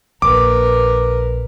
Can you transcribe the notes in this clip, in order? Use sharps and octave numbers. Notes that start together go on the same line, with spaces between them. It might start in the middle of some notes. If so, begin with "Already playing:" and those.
A#1 A#4 B4 D6